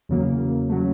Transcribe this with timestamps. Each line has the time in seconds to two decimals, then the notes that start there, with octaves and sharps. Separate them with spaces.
0.09 E2 C#3 F#3 A#3
0.70 C#3 F#3 A3